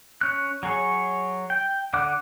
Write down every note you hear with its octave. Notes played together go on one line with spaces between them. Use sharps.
C#4 F#6
F#3 G#4 C#5
G5
D3 F#5 D6 F#6